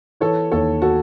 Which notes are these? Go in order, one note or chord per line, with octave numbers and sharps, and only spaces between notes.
E3 A4 C#5
D#2 A4 C#5
F#4 A4